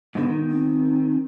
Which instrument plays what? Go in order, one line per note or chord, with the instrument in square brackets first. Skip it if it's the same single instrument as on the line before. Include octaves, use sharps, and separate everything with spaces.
[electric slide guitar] G#2 B2 D3 [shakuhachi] B3
[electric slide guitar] D#3
[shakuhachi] C4